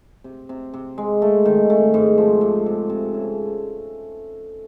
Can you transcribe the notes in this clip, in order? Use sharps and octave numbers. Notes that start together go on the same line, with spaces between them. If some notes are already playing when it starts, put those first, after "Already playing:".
C3
C3
C3
G#3
A3
D#3
A3
G#2
F3
C3
C3
C3
C#3